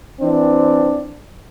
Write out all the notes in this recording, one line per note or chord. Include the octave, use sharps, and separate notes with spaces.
E3 C4 D4